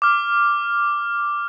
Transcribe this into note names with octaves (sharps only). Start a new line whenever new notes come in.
D6 F6